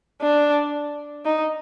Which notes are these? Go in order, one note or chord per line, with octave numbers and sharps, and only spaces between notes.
D4
D#4